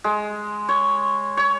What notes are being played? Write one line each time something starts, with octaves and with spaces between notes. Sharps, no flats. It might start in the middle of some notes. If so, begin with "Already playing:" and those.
G#3
C#5
C#5